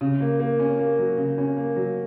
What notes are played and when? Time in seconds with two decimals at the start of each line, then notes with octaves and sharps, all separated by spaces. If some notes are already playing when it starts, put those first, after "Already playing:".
0.01 C#3
0.20 A#3
0.40 A#3
0.59 C#4
0.79 A#3
0.99 F#3
1.18 C#3
1.38 C#4
1.57 A#3
1.76 F#3